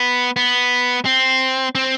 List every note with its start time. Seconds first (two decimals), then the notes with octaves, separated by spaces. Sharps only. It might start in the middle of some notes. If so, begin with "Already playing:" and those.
Already playing: B3
0.36 B3
1.05 C4
1.75 C4